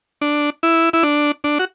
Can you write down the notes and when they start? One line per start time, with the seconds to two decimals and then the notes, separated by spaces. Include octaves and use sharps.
0.21 D4
0.63 E4
0.93 E4
1.03 D4
1.44 D4
1.59 F#4